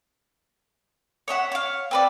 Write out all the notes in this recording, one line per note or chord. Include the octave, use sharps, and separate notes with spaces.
C#5 D#5 E5 F#5
C#5 F5
C4 B4 D5